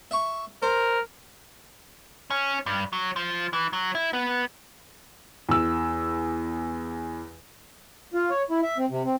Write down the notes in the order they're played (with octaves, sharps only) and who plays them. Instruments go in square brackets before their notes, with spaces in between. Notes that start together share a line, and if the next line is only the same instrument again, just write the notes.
[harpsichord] E5 C#6
[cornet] A#4 [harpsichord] C5
[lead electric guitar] C#4
G2
F#3
F3
E3
F#3
E4
B3
[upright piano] E2 E6
[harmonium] F4
C#5
E4
E5
C4
C3
C4